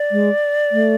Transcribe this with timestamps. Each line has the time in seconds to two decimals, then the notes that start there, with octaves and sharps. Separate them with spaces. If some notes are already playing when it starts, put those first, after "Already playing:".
Already playing: D5
0.11 G#3
0.72 A3